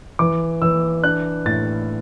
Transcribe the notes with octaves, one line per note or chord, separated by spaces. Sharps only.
E3 D6
E3 E6
D4 F#6
A2 A6